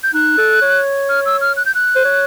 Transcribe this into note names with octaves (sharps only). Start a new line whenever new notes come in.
G6
D#4 F#6
A4
C#5
F6
E6
F6
F#6
G6
F#6
C5
C#5